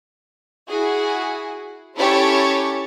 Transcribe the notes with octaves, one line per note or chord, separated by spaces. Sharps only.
E4 F#4 G#4
C#4 E4 G4 A4 C#5 A5